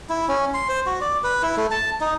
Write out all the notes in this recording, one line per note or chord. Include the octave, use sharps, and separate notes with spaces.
E4
C#4
C6
C5
F#4
D5
B4
E4
A3
A5
D#4